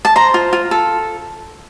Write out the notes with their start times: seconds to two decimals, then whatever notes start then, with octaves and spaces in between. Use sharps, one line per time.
0.05 A5
0.16 C5 A#5
0.34 F4
0.53 F4
0.71 A4